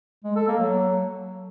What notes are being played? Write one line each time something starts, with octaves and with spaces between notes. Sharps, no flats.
G#3
A4
A#3
F#3